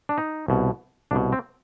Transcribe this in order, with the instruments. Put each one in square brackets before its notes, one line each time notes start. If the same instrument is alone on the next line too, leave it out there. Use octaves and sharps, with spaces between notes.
[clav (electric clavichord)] D4
D#4
C2 B2
C2 B2 D4
C4